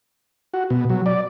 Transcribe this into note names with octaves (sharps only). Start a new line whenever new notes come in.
F#4
B2
F#3
D5